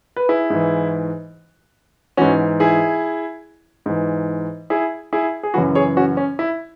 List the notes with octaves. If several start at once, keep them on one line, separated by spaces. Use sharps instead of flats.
B4
E4 G#4
G#2 E3
G#2 E3 C#4 F#4
E4 G#4
G#2 E3
E4 G#4
E4 G#4
G#4
F#2 C#3 E3 F#4 B4
G#4 C#5
C#4 F#4
C#4
E4